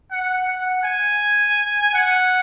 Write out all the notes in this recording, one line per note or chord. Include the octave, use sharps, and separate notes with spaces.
F#5
F#5
G#5
F#5